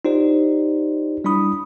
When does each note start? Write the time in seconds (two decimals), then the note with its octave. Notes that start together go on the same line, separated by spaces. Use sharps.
0.05 D#4 F4 G4 C5 D5
1.24 G3 D4 E4 B5 D#6